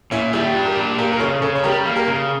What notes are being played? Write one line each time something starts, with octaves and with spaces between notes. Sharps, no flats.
A#2 C#4 E4
G3 E4 G4
D4
G4 A#4
A#2
A#3 G4 A#4
A#4
C#3 A4 C#5
C#3 A4 C#5
C#5
G3 G4 A#4
A#3
G4 A#4
C#3